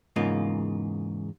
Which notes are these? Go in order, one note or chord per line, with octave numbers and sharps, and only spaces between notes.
E2 G#2 C#3 A#3 F4 D#5